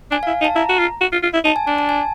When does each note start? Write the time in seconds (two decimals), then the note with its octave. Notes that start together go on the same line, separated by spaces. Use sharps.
0.11 D4 G#5
0.23 F5
0.27 E4
0.41 D#4
0.45 A5
0.55 E4 A#5
0.69 F#4
0.79 F4
1.01 F#4
1.12 F4
1.23 F4
1.33 E4
1.44 D#4 A5
1.56 G#5
1.67 D4 A5
1.78 A5
1.89 G#5